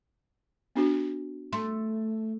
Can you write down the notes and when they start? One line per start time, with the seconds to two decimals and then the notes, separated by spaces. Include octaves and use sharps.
0.75 B3 D4 F#4
1.53 A3 C6